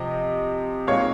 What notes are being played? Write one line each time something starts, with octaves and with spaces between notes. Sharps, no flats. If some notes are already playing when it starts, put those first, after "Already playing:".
Already playing: C3 F3 C4 D#5
A#2 G#3 C4 D#4 C#5 F5